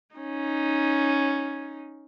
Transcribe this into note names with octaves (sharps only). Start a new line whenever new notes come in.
C#4 D#4